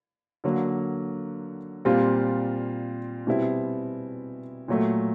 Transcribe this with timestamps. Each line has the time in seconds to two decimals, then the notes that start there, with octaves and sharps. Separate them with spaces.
0.44 D3 F#3 A#3
1.85 A#2 G3 C4 F4
3.27 B2 G3 C4 E4
4.68 A#2 F#3 A3